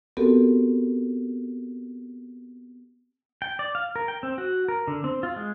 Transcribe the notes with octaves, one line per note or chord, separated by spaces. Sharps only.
B3 C4 F#4 G4 A4 A#4
G5
D5
F5
A#4
G5
C4
F#4
A#4
D3
C4
F4
G#3